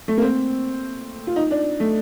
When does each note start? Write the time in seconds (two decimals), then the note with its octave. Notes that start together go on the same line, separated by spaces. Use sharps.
0.08 A3
0.18 A#3
0.22 C4
1.27 F4
1.36 D#4
1.51 D4
1.80 A3